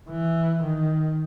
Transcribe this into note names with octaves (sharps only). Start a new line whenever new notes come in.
E3
D#3